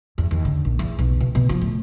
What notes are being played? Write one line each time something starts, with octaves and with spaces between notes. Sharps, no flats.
E2
D#2
D3
A#1
E2
B1
B2
B2
F3
A2